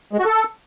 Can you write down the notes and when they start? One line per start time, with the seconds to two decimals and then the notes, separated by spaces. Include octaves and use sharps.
0.13 G#3
0.19 F#4
0.25 A4